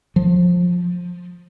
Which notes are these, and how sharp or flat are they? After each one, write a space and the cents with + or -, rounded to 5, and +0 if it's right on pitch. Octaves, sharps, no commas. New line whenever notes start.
F3 +20